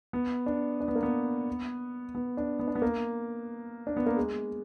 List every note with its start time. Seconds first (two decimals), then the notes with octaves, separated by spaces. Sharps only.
0.13 B3
0.46 D4
0.80 D4
0.88 B3
0.95 A#3
1.03 B3
2.15 B3
2.37 D4
2.59 B3
2.68 D4
2.75 B3
2.82 A#3
3.87 D4
3.97 B3
4.06 A#3
4.17 G#3